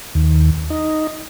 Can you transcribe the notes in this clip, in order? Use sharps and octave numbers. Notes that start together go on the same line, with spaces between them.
D#2
D#4